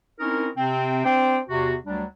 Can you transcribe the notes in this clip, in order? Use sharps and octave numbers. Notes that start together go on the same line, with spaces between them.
C4 C#4 D#4 E4 A#4
C3 C4
C4 D4 C5 G5
E2 C3 F#4
D2 F#3 G3 D4